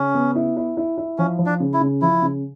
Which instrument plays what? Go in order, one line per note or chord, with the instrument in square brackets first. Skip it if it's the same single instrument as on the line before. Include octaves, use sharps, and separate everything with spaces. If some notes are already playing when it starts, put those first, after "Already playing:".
Already playing: [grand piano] C#3 [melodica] C#4
[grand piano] B3
E4
E4
E4
E4
[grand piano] F3 [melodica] C#4
[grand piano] F3
[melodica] D4
[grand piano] C#3
[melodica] E4
[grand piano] C#3
[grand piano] F3 [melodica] E4
[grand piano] C#3